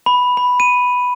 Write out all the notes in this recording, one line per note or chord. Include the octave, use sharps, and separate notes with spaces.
B5
B5
D#7